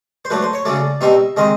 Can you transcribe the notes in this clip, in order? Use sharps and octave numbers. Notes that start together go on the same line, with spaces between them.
C5
F#3 A3 D4 B4
C5
C#5
C#3 F#3 A3 D5
B2 G3 C4 D#4 E5
D#3 G#3 C4 D#5